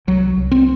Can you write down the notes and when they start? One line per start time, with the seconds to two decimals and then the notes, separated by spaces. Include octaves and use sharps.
0.07 C2 F#3
0.37 C2
0.51 C4